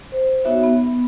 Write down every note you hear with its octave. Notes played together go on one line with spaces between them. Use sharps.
C5
B3 D#4 F#4 C#5 E5
B3